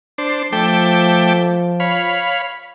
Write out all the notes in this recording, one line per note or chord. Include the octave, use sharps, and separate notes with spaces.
D4 C5
F3 A3 G5 D6
C#5 F5 B5